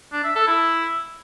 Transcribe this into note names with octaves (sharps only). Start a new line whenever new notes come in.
D4
E5
A4
E4